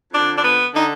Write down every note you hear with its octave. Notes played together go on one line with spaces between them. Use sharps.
F2 D3 D4
D4
B3
D3 D#4